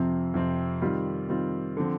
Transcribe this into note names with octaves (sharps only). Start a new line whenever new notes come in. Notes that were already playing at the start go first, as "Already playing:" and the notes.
Already playing: F2 C3 F3 C4
F2 C3 F3 C4
D#3 G3 C4 F4
D#3 G3 C4 F4
D3 F3 C4